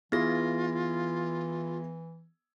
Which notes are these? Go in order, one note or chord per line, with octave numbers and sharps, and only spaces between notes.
E3 B3 E4 F4 G#4 A#6